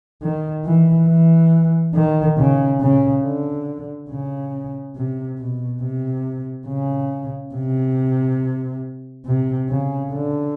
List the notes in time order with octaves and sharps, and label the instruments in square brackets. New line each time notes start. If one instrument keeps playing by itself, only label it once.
[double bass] D#3
E3
E3
D#3
C#3
C#3
D3
C#3
C3
B2
C3
C#3
C3
C3
C#3
D3